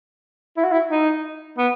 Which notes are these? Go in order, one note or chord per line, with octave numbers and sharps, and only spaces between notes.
E4
F#4
E4
D#4
B3